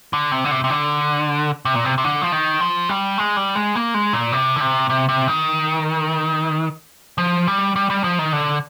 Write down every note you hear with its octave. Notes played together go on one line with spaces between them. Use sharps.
D3
C3
D3
C3
C3
D3
C3
A#2
C3
C3
D3
F3
D#3
F3
G3
G#3
G3
G#3
A#3
G#3
A#2
C3
D3
C3
C3
C3
D#3
F3
G3
G3
G3
F3
D#3
D3